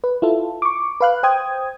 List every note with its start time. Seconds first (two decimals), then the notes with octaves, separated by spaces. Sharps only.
0.04 B4
0.22 E4 F4 A4
0.62 C#6 D6
1.01 B4 F5 F#6
1.23 C5 G5 D#6 G#6